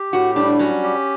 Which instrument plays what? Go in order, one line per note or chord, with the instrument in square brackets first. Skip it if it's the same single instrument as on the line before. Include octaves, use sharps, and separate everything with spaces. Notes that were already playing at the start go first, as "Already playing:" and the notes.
Already playing: [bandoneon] G4
[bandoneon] A2 [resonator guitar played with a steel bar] F#4
[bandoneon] G3 [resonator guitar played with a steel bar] D4
[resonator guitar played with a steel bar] F#3 [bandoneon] C#4
[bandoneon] G4